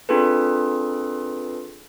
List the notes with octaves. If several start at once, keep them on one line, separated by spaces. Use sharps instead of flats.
C4 D4 F4 G#4 A4 B4